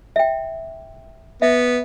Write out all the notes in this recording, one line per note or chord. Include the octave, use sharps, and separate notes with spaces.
E5 G5
B3 E5